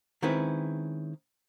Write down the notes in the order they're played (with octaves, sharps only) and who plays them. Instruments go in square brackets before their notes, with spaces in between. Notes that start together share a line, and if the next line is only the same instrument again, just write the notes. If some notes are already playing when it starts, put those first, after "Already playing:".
[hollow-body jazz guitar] D#3 G#3 C4 C#4 E4 B4